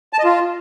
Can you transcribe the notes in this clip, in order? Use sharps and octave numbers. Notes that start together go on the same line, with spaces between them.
A5
D#5
F4